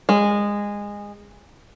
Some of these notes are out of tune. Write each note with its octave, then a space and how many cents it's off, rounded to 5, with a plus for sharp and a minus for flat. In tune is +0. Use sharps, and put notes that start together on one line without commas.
G#3 -20